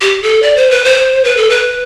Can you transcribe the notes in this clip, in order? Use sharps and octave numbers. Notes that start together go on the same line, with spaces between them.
G4
A4
D5
C5
B4
C5
B4
A4
B4